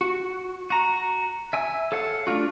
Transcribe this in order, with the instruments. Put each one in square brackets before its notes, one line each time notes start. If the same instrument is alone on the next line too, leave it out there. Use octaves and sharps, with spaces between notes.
[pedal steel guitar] F#4
F#4 A#5
E5 G#5 E6
A4 C#5 F5 F#5
A3 D4 F4 F#4